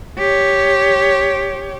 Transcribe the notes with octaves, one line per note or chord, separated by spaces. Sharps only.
G4 C#5